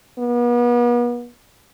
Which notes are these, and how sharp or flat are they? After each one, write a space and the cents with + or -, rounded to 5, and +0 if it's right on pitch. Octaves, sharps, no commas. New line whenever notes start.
B3 -40